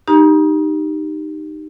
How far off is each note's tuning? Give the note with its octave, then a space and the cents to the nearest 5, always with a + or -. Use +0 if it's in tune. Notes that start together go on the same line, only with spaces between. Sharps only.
D#4 -15 G4 +0 A#5 +35